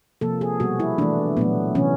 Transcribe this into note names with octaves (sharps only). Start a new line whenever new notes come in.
C3 F3 A#3 A4
G#4
B2 G3 B3 F#4
E4
E3 A3 D4
A#2 F#3 A3 B3
C3 E3 A3 C#4